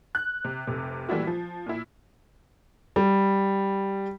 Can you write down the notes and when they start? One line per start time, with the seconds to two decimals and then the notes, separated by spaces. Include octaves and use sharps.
0.15 F#6
0.45 C3
0.67 F1 C3
1.09 A#2 E3 G3 A3 E4 F#4
1.27 F3
1.66 A#2 E4
2.96 G3